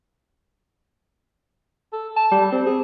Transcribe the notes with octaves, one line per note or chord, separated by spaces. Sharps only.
A4
A5
G3
C4
G#4